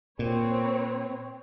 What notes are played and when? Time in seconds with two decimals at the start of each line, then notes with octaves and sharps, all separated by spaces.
0.19 A#2 C4 B4 C#5